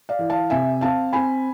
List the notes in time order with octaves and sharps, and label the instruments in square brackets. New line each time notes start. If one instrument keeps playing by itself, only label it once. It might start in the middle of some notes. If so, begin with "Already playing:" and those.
[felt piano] D5 F5
E3
F5 A5
C3 E5 G#5
C4 F5 A5
C4 G#5 B5